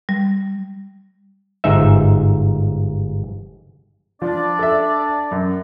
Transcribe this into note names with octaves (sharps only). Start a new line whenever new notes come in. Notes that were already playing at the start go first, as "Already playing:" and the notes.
G3
G1 G#2 D#4 E5
F3 D4 D5
A4 E5
F#2